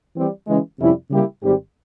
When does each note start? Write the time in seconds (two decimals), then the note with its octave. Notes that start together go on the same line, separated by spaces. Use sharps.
0.15 E3 G3 C4 G4
0.47 C#3 E3 G#3
0.79 F2 C3 G3 C#4 E4
1.10 C#3 G3 A#3 E4 G4
1.42 G#1 G#2 G3 C4 G4